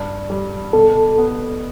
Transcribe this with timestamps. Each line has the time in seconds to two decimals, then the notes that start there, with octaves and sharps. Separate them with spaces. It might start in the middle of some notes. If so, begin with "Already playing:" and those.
Already playing: G2
0.30 G3
0.73 B2 A4
1.18 B3